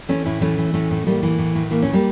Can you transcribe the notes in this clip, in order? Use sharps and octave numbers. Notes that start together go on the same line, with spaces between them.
E3 A3 C#4
A2 C#4 E4
E3 A3 C#4
E3
A2 A3 C#4
A2
A2 G3 A#3
E3
A2
A2
E3 A#3
C#4
E3
G3 A#3